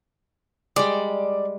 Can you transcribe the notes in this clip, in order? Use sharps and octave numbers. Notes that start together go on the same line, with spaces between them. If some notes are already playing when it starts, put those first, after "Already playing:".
G3 G#3 D5